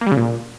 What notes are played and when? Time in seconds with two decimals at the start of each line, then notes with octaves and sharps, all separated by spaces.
0.01 A#3
0.06 G3
0.12 C#3
0.17 A#2